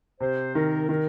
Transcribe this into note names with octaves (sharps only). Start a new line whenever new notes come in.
C3 C5
D#3 A#4
D#3 A#4